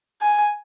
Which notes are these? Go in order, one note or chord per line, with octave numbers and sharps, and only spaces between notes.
G#5